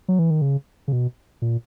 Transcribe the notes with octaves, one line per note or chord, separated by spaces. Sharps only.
F#3
E3
D#3
C#3
C#3
B2
A#2